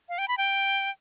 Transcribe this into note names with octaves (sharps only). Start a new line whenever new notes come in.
F5
G5
B5
G5